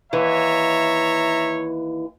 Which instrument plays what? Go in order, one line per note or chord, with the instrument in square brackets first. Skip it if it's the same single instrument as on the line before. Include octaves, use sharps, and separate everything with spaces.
[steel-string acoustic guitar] D#2 E3 [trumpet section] C#5 E5 A#5